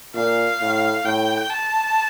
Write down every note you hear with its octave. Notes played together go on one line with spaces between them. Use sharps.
A#2 F5
A2
A2 G5
A5